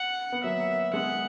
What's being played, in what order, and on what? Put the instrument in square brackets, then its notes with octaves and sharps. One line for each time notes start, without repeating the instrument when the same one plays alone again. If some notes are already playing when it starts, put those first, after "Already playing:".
Already playing: [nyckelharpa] F#5
[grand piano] B3
[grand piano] F#3 A#3 [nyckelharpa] E5
[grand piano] G#3 B3 [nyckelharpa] F#5